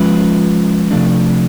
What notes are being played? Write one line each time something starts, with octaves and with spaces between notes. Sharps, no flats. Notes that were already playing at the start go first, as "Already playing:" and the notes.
Already playing: F3 G#3 C#4 F4 B4
C3 F3 A3 D4